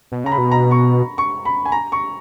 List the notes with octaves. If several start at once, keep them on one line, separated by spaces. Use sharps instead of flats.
B2
C#3 A#5
B5
B2
A#5
C#6
C#6
B5
G#5
A#5
C#6